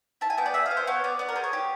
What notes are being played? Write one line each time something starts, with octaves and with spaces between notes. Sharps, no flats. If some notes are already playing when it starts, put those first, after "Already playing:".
E4 A5
G#5
B3 G5
D5
G#4 E5
F5
B3
C5
B3 C#5
B3 D5
B3 D5
A#4
G#4 C5
C#5
G4